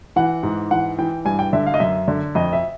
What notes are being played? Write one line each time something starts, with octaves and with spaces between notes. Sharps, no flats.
E3 F#5
G#2
E3 F#5
E3 G5
G2 G#5
G5
D3 E5
F5
D#5
F#2 E5
D3
F2 D#5
E5